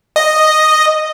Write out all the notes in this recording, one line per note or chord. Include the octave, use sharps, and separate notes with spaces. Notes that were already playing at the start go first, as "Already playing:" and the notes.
D#5